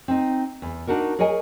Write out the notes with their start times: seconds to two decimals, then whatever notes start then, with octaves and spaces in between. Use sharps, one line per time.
0.08 C4 D#4
0.62 E2
0.87 D4 D#4 F#4 A#4
1.19 G#4 A#4 C#5 D#5 G#5